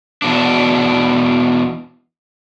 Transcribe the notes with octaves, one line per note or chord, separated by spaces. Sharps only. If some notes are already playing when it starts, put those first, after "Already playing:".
E2 B2 D4